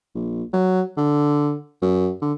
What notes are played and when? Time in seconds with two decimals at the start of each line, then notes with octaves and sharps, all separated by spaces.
0.15 A#1
0.53 F#3
0.97 D3
1.82 F#2
2.22 D3